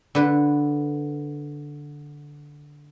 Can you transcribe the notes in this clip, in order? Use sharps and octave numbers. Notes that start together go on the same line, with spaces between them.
D3 B4